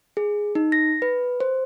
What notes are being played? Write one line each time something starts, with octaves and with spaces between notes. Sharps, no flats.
G#4
D#4
A#6
B4
C5